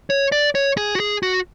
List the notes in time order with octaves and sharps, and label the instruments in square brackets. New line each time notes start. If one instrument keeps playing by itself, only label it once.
[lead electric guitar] C#5
D5
C#5
G#4
F#4
G#4
F#4